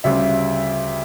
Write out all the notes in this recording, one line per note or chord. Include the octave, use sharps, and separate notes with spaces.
D2 C#3 G3 E5